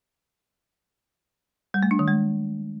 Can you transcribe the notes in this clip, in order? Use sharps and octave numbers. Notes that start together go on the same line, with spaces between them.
G3
A3
D4
D#3
G#3